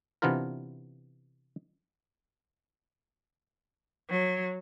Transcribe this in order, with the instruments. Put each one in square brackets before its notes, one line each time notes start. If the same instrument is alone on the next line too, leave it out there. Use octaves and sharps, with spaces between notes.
[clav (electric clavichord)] C3 E3 B3 D4 F4 A#4
[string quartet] F#3